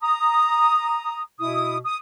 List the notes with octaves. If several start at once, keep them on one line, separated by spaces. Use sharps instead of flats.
A#5 D#6
B2 E4 D#6
D#6